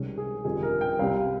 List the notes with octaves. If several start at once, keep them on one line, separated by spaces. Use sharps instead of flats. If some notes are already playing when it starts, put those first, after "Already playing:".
Already playing: C2 C3 D#3 G#3 C#4
G#4
G1 F2 D#3 G3 G#4
A#4
G5
C2 C3 G3 F5